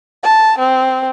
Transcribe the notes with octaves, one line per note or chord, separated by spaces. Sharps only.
A5
C4